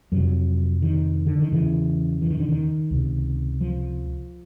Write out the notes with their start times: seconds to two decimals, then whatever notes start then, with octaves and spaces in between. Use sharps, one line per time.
0.12 F2 C3 F#3
0.82 D#3
1.27 D3
1.39 D#3
1.51 E2 C#3 E3
2.22 E3
2.31 D#3
2.40 D3
2.49 D#3
2.91 C#2 C3
3.61 F3